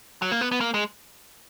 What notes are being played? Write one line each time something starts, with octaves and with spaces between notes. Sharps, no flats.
F#3
A#3
B3
B3
A#3
G#3